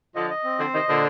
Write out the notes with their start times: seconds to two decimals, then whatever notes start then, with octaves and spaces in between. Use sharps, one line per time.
0.15 D3 F3 D#5
0.30 D#5
0.44 C4
0.59 D3 F3 C5
0.74 C3 D#3 D#5
0.88 A#2 D3 C5